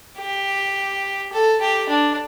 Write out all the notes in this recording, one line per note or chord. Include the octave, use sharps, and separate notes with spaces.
G4
A4
G4
D4